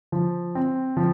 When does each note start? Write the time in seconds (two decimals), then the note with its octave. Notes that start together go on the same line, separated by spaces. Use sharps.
0.12 F3
0.55 C4
0.97 F3